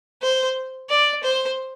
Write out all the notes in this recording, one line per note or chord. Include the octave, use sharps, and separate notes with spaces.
C5
D5
C5